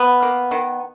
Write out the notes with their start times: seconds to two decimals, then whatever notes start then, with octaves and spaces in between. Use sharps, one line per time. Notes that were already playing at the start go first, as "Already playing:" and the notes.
Already playing: B3
0.22 A#3
0.51 D#3